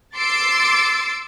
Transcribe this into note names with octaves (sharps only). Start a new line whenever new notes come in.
C6 D6 E6 A6 C7 D7